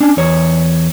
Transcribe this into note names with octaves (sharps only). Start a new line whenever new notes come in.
C#4 D4
E2 C#5